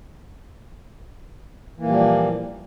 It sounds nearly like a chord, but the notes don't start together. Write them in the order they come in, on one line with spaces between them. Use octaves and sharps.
E3 A#3 A#2 G3 F3